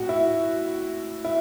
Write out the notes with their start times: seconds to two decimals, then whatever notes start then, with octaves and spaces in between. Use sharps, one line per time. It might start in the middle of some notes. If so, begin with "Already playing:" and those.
Already playing: A2 F#4
0.09 E4
1.24 E4